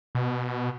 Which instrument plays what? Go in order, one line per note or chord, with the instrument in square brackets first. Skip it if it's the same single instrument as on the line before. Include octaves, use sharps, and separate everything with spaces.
[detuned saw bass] B2